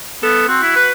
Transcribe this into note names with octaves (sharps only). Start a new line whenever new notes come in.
B3 A4
C4 F#4
E4
B4